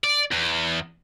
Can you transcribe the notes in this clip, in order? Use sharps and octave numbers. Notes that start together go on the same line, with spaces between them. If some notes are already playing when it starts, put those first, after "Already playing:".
D5
E2